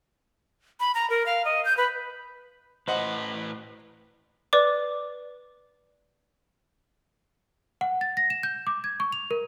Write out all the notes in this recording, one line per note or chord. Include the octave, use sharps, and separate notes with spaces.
B5
A#5
A#4
F5
D#5
G6
B4
A2 B4 C5 D#5 F#5
B4 D5 D6
F#5
A6
A#6
E7
G6
D6
G#6
C#6
F7
A#4